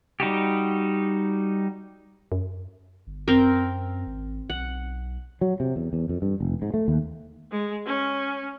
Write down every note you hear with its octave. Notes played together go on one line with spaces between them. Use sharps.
G3 D#4 F#4 G4
F#2
G1
F#2 C4 A#4
G#1
B1 F#5
F#3
C3
E2
E2
F2
G2
F1
G#2
A3
D#2
G#3
C#4